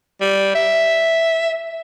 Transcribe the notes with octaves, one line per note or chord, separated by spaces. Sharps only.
G3
E5